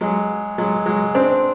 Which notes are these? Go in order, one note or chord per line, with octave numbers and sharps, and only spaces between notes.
F#3 G#3
F#3 G#3
F#3 G#3
C4 D4